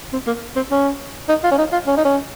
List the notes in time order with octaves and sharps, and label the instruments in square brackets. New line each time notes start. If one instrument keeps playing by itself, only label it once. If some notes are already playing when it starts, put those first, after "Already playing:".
[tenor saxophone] C4
A#3
C4
C#4
D#4
F4
C#4
D#4
F4
C#4
D#4
C#4